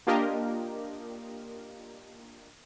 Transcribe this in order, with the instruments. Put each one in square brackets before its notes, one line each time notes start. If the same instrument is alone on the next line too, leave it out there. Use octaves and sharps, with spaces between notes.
[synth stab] A#3 D4 F4 G4 A#4 D#5